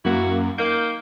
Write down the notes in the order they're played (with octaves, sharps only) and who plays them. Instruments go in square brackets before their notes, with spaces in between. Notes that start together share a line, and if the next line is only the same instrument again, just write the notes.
[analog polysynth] F#2 A#3 [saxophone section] E4 F#4
[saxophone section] D#3 A#3 [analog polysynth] G6